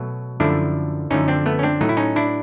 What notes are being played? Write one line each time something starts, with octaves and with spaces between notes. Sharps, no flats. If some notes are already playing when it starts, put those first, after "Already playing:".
Already playing: B2 F#3 A3
F#2 D3 F3 A3 D4 E4
F#2 D3 F3 A3 C#4 D#4
C4 D4
A3 B3
C#4
C4 D4
A2 F#3 A3 D#4
E4
C#4 D#4
D4 E4